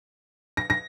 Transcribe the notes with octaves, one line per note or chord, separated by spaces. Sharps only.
A#6
A#6